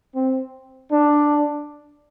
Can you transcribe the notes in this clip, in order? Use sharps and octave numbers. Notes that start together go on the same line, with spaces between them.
C4
D4